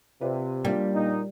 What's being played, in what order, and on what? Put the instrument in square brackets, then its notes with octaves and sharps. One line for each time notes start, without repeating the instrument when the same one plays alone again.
[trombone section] C3 [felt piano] F4 B4 D5
[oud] G3 [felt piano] A#3 D4 F4
[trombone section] A#2 D#4